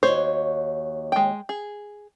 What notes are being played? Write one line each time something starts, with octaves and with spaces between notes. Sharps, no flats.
D#2 F#4 C5 C#5
G#3 G5
G#4